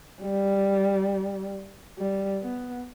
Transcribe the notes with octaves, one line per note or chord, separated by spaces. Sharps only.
G3
G3
B3